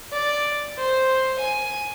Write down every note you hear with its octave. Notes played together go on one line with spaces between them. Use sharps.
D5
C5
G#5